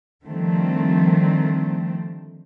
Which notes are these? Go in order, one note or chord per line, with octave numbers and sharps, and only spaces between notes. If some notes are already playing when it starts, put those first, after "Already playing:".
D3 D#3 F3 G3 A3 C4